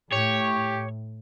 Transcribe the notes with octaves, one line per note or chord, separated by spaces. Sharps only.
A2 G4 C#5